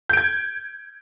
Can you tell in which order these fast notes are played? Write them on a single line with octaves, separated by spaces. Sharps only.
G6 D7 G#6